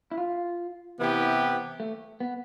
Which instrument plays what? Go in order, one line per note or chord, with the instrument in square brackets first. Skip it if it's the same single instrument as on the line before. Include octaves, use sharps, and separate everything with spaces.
[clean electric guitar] E4
F4
[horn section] C3 E3 B3 E4 G4
[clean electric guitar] A3
B3